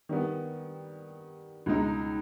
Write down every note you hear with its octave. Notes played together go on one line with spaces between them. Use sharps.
D#3 G3 B3
C#2 B2 G#3 D#4